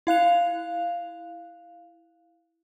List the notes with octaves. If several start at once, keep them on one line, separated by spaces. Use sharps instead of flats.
E4 F5 F#6 F7